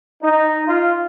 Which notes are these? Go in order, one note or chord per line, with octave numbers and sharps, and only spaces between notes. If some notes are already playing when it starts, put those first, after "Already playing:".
D#4
F4